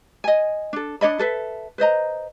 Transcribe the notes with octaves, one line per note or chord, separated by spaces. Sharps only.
D#5 G#5
D4 A4
D4 C#5 D#5 B5
A4 B4 E5
B4 C5 D#5 A#5